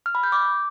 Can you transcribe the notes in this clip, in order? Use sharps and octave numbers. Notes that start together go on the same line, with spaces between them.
F6
B5
G6
D6